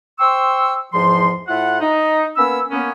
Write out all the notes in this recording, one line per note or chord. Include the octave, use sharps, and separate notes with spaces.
C5 G5 C6 C#6 E6
E2 G#2 F3 C6
A2 E4 F4 F#5
D#4
A#3 B3 C#4 B5 E6
A#3 B3 C#4